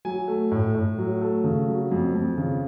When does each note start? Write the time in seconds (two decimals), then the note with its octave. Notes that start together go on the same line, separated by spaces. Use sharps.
0.05 F#3 G#5
0.28 A3
0.51 A2
0.75 A2
0.98 F#3
1.21 A3
1.44 C#3
1.68 F#3
1.92 F2
2.15 F2
2.37 C#3